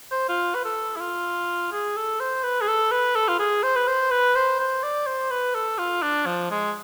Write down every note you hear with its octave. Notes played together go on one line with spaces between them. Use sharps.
C5
F4
B4
A4
E4
F4
G#4
A4
C5
B4
G#4
A4
B4
A4
F4
G#4
C5
B4
C5
B4
C5
C5
D5
C5
B4
A4
F4
D4
F3
G#3